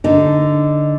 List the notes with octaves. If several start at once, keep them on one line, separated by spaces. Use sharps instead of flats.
D3 D#4